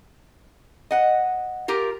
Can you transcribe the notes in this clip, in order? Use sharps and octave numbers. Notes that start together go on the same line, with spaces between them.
D#5 F#5
F4 G4 A#4